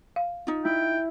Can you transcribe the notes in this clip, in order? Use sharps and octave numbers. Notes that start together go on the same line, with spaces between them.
F5
D#4 F4
E4 G5